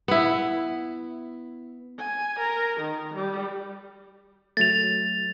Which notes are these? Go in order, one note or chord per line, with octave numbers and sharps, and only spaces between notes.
B3 E4
G#5
A#4
D#3
G3
F#3 A3 A6 F7